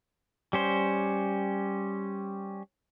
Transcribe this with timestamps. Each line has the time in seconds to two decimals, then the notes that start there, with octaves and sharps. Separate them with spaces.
0.53 G3 C#4 C5